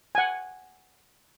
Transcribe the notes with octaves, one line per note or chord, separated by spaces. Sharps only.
F#5 G#5